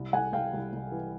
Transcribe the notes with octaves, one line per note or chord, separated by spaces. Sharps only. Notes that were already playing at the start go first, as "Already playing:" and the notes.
Already playing: C2
C2 F#5 G#5
C2 F5 G5
C2
C2
E3